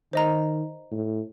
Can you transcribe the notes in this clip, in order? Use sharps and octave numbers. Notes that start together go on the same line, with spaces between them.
D#3 C5 D#5 A#5
A2